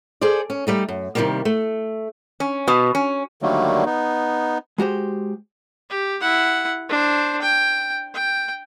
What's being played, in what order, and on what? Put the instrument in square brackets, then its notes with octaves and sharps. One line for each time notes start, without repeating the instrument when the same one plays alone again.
[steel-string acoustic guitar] G#4 A4 C5 D5
C#4
G3 A3 D#4
F#2
C3 D#3 E3 G3 G#3 A#3
A3
[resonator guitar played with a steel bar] C#4
B2
C#4
[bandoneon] D3 D#3 F#3 G3 A3 A#3
B3 D#4
[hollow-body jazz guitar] G#3 F#4 G4 C5
[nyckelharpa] G4
E4 F#5
D4 C5
G5
G5